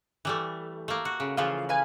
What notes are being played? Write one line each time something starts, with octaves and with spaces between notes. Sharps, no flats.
E3 G3 A3
A3 A#3
F#4
C#3
C#3 E3 F3 F4
B4 F5 G#5